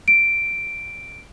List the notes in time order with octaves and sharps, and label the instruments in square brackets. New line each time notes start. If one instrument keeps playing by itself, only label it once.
[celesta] D7